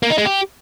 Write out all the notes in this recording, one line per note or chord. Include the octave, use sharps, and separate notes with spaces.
A#3
D#4
G#3
G4